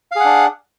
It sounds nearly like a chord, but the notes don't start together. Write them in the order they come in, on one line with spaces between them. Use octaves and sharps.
F5 G#4 F#5 D4